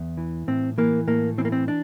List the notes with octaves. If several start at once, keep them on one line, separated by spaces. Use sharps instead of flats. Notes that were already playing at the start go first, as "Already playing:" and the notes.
Already playing: E2
E3
A2 C4
E3 A#3
A2 A#3
E3 C4
A#3
C4
D4